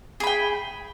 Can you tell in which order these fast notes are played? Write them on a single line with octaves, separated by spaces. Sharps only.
G#4 B5 G5